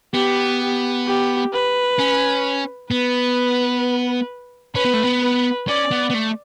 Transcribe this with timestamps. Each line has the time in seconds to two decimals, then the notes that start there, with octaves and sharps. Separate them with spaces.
0.14 B3 G4
0.60 G4
1.07 G4
1.53 B4
1.99 C#4
2.91 B3 B4
4.75 C#4 B4
4.85 B3
4.94 A3
5.03 B3
5.22 B4
5.68 C#4 D5
5.91 B3
6.10 B3
6.14 A3